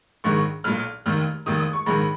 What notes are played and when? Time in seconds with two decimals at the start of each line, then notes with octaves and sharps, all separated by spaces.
0.24 A#1 G#2 D#3 C#6
0.64 B1 A#2 F6
1.06 F1 D#2 D#3 F6
1.46 F1 D#2 D#3 D#6
1.60 D#6
1.73 C#6
1.86 A#1 G#2 D#3 B5